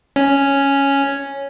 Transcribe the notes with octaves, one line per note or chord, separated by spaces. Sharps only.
C#4